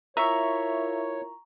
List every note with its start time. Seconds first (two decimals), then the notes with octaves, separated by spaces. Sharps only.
0.17 E4 F4 A#4 C#5 E5 A#5 C#6